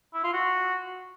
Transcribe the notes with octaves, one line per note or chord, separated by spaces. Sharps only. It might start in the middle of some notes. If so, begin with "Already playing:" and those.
E4
F4
F#4